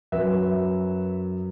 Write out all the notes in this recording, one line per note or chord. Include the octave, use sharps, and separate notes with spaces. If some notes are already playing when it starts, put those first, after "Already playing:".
F#2 F#3 B4 E5